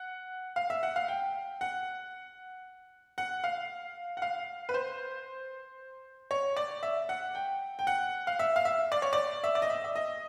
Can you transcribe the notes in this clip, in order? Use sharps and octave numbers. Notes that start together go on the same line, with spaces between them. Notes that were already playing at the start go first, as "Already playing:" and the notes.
Already playing: F#5
F5
E5
F#5
F5
G5
F#5
F#5
F5
F#5
F5
B4
C5
C#5
D5
E5
F#5
G5
G5
F#5
F5
E5
F5
E5
D5
C#5
D5
E5
D5
D#5
E5
E5
D#5